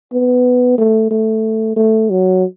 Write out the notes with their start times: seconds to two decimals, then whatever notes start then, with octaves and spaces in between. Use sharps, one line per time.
0.13 B3
0.78 A3
1.11 A3
1.76 A3
2.10 F#3